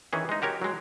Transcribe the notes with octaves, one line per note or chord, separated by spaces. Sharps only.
D#3 E3 C#4 G#4
G#3 D#4
F#4 G4 A#4 C#5
F#3 G#3